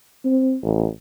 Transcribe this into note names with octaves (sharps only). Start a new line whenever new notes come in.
C4
A1